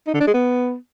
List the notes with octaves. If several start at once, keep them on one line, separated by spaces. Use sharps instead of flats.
D#4
D3
D4
G#3
B3